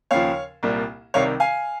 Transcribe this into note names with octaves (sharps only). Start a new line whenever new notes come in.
D#2 C#3 F3 C#5 F5
C2 A#2 G3 A#3
C2 C3 D#3 G3 C#5 F5
F5 G#5